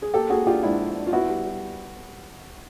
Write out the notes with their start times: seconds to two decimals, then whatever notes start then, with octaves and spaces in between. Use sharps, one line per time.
0.02 G#4
0.14 A#3 G4 A4
0.30 A#3 F#4 G#4
0.47 D4 F4 G4
0.63 G#2 D4 E4
0.80 F3
0.96 D4
1.07 F4
1.13 B3 E4 F#4
1.30 G3
1.46 G3